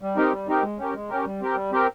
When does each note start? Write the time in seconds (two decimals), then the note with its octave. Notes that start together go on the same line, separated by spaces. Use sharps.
0.02 G3
0.17 C4 D#4 G4 A#4
0.32 G3
0.48 C4 D#4 G4 A#4
0.63 G#3
0.78 C#4 G4 A#4
0.95 G#3
1.10 C#4 G4 A#4
1.25 G3
1.41 C4 G4 A#4
1.56 G3
1.72 C4 G4 A#4